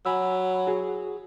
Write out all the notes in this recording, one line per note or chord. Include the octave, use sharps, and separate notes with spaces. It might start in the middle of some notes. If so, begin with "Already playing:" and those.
F#3 G#5 B5 E6
F#4 G#4